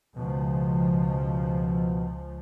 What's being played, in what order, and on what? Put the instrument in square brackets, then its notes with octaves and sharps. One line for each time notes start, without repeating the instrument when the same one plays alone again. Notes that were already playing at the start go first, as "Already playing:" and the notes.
[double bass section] C#2 F3 [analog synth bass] B2